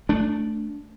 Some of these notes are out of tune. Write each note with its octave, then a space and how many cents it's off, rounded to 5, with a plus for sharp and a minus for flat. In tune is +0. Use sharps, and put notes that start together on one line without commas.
A3 +0 D4 -10